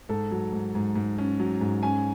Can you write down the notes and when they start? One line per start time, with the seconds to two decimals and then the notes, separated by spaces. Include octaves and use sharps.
0.09 G#2 A4
0.31 F#3
0.52 G#2
0.75 G#2
0.96 G#2
1.18 C#4
1.40 F#3
1.61 G#2
1.83 C#4 G#5